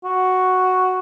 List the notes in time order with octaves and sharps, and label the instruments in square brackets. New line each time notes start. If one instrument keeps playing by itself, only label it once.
[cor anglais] F#4